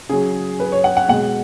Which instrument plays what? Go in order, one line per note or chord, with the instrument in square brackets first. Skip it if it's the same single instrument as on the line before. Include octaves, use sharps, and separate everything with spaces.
[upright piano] C#3 F#3 G#4
B4
C#5
F#5
F#5
B2 G#3 F#5